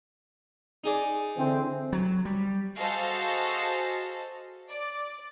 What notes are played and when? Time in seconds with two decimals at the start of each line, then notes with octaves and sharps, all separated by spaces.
0.84 D#4 G#4 D5
1.37 D3 E3 C4
1.93 F#3
2.25 G3
2.79 F#4 G#4 A4 C5 D#5 F5
4.71 D5